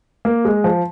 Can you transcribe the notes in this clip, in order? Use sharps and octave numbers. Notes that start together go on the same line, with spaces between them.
A#3
G#3
F3